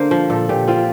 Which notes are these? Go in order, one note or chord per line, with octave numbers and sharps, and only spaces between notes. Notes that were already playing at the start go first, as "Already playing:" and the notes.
Already playing: D3 A#3 C5
F3
A#2 A4
A#2 G4
C4 F4